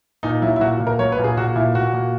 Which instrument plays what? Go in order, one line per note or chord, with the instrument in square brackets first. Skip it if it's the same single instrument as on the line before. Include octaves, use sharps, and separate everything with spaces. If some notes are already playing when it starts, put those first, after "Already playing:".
[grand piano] A#2 D#4
F#3 E4
E4
A#2 F#4
A#2
A#4
F#3 C#5
B4
A#2
G#4
A#2 F#4
A#2 E4
A#2 F#4
A#2